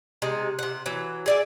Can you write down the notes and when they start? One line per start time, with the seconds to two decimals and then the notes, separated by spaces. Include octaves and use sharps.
0.22 C3 G#3 D#4
0.59 C3 F#5
0.86 E3 F#3
1.26 G#4 D5 E5